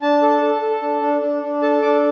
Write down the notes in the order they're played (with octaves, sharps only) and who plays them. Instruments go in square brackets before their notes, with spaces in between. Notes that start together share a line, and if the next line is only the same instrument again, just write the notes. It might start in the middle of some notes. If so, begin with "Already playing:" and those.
[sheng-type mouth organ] D4 A5
A4
A4
A4
D4
D4
D4
D4
A4 A5
D4 D6